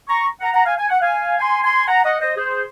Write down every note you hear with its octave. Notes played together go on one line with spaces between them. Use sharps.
A#5 C#6
F#5 A#5
F#5 A#5
F5 G#5
G#5
F#5
F5 G#5
G#5 C6
G#5 C6
F#5 A#5
D#5 F#5
C5 D#5
G#4 C5